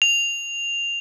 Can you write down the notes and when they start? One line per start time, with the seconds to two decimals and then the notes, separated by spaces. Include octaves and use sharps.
0.02 F7